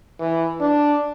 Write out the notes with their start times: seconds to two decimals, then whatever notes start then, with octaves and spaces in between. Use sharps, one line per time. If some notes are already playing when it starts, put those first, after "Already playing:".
0.20 E3
0.60 D4